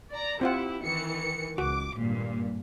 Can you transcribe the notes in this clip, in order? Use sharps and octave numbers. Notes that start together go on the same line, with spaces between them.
D5 A#5
C4 E4 F4 G4 F#5
D#3 E3 C#7
C#2 F#4 D6
G#1 G2 A#2